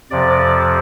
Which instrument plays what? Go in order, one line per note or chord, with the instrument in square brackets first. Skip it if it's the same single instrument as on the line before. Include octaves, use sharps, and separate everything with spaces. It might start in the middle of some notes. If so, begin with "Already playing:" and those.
[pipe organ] F2 C3 F3 D5